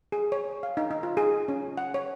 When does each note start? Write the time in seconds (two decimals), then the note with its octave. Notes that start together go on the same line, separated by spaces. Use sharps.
0.12 G#4
0.32 C#5
0.63 F5
0.77 D#4
0.91 D#4
1.03 F4
1.17 G#4
1.48 C#4
1.77 F#5
1.94 C#5